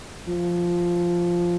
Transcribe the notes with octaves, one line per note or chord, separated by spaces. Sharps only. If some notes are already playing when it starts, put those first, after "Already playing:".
F3